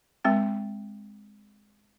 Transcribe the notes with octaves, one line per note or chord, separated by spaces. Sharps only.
G#3 C4 G5